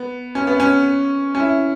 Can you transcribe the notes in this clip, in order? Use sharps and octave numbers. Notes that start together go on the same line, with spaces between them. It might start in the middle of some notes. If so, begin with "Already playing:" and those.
Already playing: B3
C#4
B3
C#4
C#4
E4